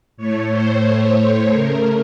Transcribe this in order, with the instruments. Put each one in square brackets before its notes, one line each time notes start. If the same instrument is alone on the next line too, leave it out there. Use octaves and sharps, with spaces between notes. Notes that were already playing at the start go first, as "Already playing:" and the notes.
[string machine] A2 A3 C#5
C5
C#5
C#5
C#3 A3 A#4